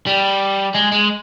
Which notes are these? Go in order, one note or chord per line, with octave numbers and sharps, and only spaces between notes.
G3
G#3
G#3